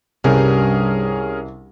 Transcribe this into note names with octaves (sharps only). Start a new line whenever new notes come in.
C2 G2 C#4 G#4 A#4